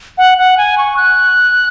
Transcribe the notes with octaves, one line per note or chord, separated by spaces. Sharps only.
F#5
F#5
G#5
C#6
F#6